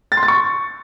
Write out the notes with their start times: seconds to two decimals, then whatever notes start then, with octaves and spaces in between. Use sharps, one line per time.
0.12 A6
0.17 C6
0.23 A6
0.28 C#6